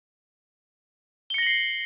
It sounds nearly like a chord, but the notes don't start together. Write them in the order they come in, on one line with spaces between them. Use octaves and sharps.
G7 C#7 A#6 F#7 C7